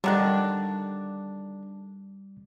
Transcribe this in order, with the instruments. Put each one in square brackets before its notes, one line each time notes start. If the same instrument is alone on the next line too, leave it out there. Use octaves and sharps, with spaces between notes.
[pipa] D3 D#3 D4 [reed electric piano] G3 F#6